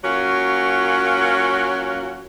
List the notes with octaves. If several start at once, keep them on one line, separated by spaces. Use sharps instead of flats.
F#3 A#3 C#4 F4 F#4